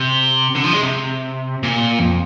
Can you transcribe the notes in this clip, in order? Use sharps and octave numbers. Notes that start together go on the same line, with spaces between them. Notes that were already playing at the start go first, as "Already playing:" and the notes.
Already playing: C3
D3
F3
G#3
C3
A#2
F2